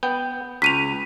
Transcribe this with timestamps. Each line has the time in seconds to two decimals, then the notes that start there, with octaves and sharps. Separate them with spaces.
0.03 B3 G5
0.62 C#2 B6 D#7 F7